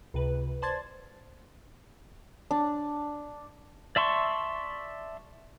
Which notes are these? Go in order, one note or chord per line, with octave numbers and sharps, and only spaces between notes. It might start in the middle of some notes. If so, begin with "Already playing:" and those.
C#2 C3 B4
C5 D5 A5 C6 G#6 A6
D4
D5 E5 A5 C6 C#6